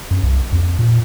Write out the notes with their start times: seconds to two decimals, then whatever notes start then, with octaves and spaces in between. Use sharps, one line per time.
0.11 F#2
0.23 C2
0.53 F2
0.79 A#2